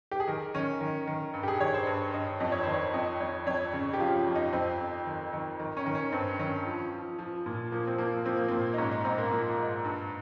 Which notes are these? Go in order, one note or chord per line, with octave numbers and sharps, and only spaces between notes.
G4
G#4
D#3 A#4
D#3 C#4
D#3
D#3
G2
G4
G#4
D#3 C#5
C5
G2
G2 D#5
F2 D#5
C#5
D#3 C5
C#5
F2 D#5
F2 C#5
F2 C#5
C#3
G4
F3 F4
F2
D#4
F2 C4
F2
D#3
D#3
D#3
C#4
D#3
C#4
G2 C4
D#3 C#4
F3
F3
F3
A#2
F3 A#3
C4
F3 A#3
F3 C4
A#3
A#2 C4
D#4
G#2 C#4
D#4
G#2 C4
A#3
F3 A#3
G#2
G2